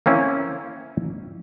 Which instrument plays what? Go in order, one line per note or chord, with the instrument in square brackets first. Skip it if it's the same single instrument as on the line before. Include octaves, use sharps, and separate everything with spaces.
[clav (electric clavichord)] A#3 C4 C#4 E4